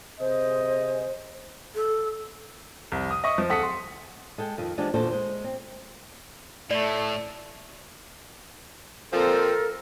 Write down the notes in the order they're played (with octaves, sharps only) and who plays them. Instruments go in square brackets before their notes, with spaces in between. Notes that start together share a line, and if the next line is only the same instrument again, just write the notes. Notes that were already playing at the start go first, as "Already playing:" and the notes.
[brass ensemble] C3 G#4 D#5 [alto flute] C5
[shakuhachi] A4
[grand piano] C2 F2
D#6
D#5 E5 C#6 D#6
F3
D1 A4 F#5 D#6 B6 C#7
C6
[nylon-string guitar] G#3 A4 G5
F2 D#3
E3 F3 G#3 D4 G4
E2 A#2 D3 F#4 A4 C5
G#3 C5
C4
[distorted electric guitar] A2 [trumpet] A3 [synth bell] D5
[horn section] A#2 F3 C4 [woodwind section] A4 A#4